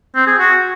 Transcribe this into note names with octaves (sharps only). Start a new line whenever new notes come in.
C4
G#4
F#4